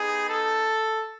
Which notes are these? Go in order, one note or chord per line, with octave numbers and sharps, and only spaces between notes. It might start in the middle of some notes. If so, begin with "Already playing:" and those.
Already playing: B3 D#4 G4 G#4
A4